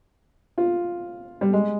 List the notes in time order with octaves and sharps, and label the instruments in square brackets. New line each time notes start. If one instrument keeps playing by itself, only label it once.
[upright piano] F4
G3
G#3